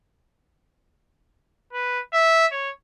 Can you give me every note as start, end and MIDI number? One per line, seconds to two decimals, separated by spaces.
1.73 2.00 71
2.13 2.46 76
2.52 2.70 73